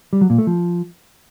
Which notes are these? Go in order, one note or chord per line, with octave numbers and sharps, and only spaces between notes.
G3
F#3
A#2
A3
F3